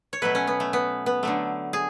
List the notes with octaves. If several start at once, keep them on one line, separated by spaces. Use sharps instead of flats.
C#5
B2 F#3 A3 B4
C#4
B3
A3
B3
B3
D3 F#3 A3
G#4